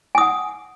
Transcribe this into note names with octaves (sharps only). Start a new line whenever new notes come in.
F#5 G#5 D#6